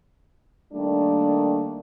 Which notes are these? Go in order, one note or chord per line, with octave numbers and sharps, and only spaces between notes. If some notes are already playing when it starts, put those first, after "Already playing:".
D#3 G3 A3 A#3 D4